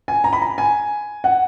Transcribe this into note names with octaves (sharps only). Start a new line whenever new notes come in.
G#5
A#5
B5
A#5
G#5
F#5